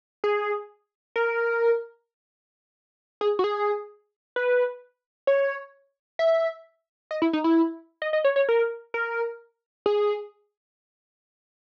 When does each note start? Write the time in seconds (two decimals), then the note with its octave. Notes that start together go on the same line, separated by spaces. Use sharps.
0.24 G#4
1.16 A#4
3.21 G#4
3.39 F#4
3.44 G#4
4.36 B4
5.27 C#5
6.19 E5
7.11 D#5
7.22 E4
7.33 D#4
7.44 E4
8.02 D#5
8.13 D#5
8.24 C#5
8.36 C#5
8.49 A#4
8.94 A#4
9.86 G#4